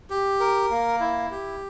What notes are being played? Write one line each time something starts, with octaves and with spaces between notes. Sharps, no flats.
G4
A#4
A#3
E4
G4